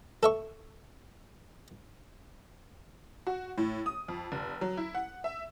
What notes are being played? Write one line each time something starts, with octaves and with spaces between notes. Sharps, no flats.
A4 E5 C#6
F#4
A2
D#6
F2
F1
F#3
E4
F#5
E5